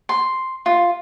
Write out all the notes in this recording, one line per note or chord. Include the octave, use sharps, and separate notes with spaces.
C6
F4